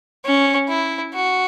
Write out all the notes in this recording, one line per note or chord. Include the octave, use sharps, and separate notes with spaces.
C#4
E4
F#4